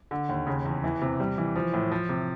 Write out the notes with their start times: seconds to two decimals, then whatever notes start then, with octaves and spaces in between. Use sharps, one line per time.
0.11 D3
0.29 D#2
0.47 C#3
0.65 E2
0.84 E3
1.02 C3
1.20 G3
1.38 E3
1.56 F3
1.73 A2
1.92 F3
2.09 C3